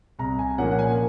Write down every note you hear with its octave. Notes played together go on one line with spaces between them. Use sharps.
C2 A#5
G#5
A#2 F3 A#3 C#4 F#5
F#5
G#5